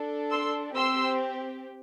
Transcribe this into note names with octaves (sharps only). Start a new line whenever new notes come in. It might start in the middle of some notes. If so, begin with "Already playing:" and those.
Already playing: D4 A4
C6 E6
C4 G4 C6 E6